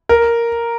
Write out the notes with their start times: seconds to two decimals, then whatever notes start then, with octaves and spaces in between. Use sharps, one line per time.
0.09 A#4